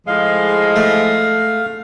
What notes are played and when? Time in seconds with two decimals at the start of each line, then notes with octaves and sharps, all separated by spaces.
0.07 A2 F3 G#3 F5
0.76 A3